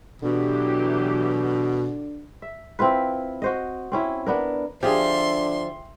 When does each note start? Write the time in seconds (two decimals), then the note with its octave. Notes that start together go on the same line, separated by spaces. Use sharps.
0.22 B2 D3 E3 F#3 G4
2.42 E5
2.79 C4 E4 F4 B4
3.42 F#4 C5 D#5
3.92 C4 C#4 E4
4.26 B3 D4 A#4
4.83 D3 F3 G4 G#4 E5 C6